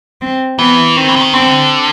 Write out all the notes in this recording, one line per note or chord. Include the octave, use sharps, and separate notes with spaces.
C4
E3 B3
D#3 C4
E3
D3
D#3
D3 C4